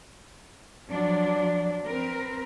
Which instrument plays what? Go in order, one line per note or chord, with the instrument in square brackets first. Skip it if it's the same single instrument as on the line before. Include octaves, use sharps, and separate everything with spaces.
[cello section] F3 F#3 D4
C4 A#4 B4